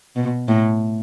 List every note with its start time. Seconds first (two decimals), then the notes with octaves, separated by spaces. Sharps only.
0.16 B2
0.48 A2